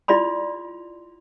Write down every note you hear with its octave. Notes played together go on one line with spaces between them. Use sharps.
E4 F4 D5 B5 C6